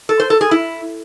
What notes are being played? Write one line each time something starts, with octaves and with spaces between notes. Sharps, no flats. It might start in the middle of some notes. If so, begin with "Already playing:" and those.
A4
C5
A4
G#4
E4